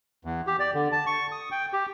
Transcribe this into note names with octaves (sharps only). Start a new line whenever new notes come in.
E2
G4
D5
D3
A5
C#6
D#6
G5
G4